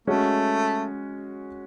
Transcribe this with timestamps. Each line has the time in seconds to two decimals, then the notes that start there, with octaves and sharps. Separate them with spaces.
0.07 G#3 A3 C#4 F#4